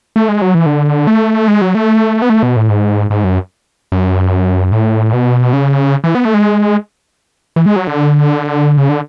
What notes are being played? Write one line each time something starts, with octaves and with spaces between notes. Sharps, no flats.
A3
G#3
F#3
E3
D3
A3
G#3
F#3
A3
B3
A3
B2
A2
G#2
G#2
F#2
F#2
A2
B2
C#3
E3
B3
A3
G#3
E3
G#3
F#3
D3
C#3
D3